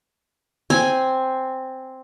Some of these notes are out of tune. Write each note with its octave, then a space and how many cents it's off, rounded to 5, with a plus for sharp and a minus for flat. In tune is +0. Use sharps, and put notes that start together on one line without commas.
C4 +0 G#5 +0